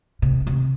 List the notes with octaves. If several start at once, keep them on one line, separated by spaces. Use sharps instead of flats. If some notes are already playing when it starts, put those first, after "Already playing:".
C3
C3